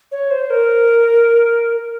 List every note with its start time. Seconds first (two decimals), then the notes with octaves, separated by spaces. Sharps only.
0.11 C#5
0.31 C5
0.50 A#4